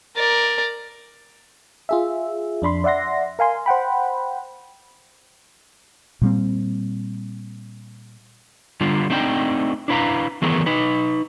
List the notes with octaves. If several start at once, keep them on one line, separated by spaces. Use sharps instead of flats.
A#4 D5
F4 G#4 E5
F2 D4 B5 C6
D5 E5 F#5 C6 A#6
A#4 F5 G#5 C6
C5 F#5 G5 B5
A#2 G3 C4
D3 G3 F4
A3 C4 D4 D#4 B4 G5
D4 E4 B4 F5 A#5
D#3 E3 A3 B3 G#4 A#4
D#4 B4